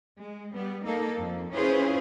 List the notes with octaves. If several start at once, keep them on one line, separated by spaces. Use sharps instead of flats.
G#3
G3 B3
A#3 D#4 A4
F2
C#4 E4 F4 G#4 B4 C5